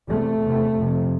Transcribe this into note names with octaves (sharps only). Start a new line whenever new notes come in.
E2 C3 A3
E2 C3
F2 C3